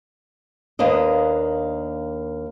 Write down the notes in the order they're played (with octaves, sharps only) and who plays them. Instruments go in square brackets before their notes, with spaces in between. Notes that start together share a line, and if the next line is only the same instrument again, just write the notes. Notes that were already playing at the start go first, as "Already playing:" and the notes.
[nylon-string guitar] D#2 A#3 B3 D4 D#5